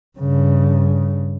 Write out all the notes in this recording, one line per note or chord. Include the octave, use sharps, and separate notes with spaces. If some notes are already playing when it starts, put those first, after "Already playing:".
G2 C#3